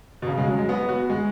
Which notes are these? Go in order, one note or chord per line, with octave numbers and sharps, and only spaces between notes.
B2
C#3
G#3
F#3
G#3
B3
F#4
G#3